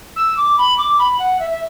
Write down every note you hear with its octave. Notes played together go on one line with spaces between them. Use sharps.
E6
D6
B5
D6
B5
F#5
E5
E5